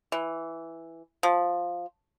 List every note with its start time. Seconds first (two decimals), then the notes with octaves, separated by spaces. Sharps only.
0.12 E3
1.23 F3